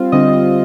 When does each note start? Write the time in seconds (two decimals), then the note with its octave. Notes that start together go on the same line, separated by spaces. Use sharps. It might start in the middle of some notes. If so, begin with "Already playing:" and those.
Already playing: G3 C4 F4
0.12 D3 G3 C4 D#5